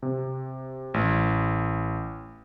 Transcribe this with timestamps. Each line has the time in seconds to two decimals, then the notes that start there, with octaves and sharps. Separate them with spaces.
0.03 C3
0.94 A1